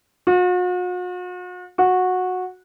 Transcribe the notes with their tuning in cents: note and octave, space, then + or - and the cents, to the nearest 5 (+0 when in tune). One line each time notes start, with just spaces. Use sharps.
F#4 -45
F#4 -15